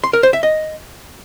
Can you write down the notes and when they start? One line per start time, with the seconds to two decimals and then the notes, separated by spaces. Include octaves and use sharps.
0.04 C6
0.13 A#4
0.23 C5
0.33 E5
0.43 D#5